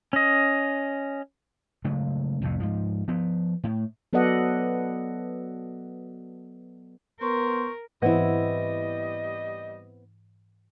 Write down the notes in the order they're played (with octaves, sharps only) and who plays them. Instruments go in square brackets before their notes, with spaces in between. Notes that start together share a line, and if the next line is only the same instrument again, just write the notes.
[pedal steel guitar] C#4 D#5
[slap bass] C#3 F#3 G#3 A3
C2 F2 A2 C3
G#2 F3
F3 B3
A2
[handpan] F#3 B3 A4 D5 D#5 F#5
[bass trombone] B3 [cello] A#4 [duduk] C5 [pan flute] C#6
[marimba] G#2 E3 [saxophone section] G3 D#5 [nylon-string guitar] B3 C4 E4